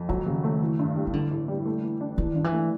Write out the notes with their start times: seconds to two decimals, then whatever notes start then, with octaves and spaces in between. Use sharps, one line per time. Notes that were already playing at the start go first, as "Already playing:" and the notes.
Already playing: F2
0.09 D#3 F#3
0.26 C#3
0.44 A3
0.61 E3
0.79 G2
0.96 G3
1.07 D#3
1.13 D3 E3
1.31 A2
1.48 G3
1.66 A3
1.83 E3
2.01 D4
2.18 D#3 E3
2.36 G2
2.44 E3
2.53 A3